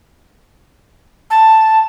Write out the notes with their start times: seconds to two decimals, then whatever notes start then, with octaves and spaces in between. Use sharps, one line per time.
1.30 A5